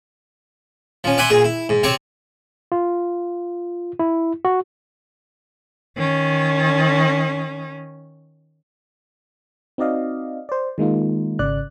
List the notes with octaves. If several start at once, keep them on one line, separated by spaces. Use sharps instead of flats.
F3 C#4
D5 E5 F#5 G#5 B5 C6
A#2 G#4
E4
G#2
C3 C4 C#5 D5
F4
E4
F#4
D#3 C#4
C4 D#4 F#4 D5 D#5 F5
C5 D5
D#3 G#3 A#3 D#4 F4
G#1 C#3 D5 F#6